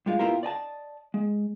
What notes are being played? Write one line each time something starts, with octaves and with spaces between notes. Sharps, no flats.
G2 G#3 F4
B2 B3 E4 F4 G4 A#4
D5 D#5 G#5 A5
G#3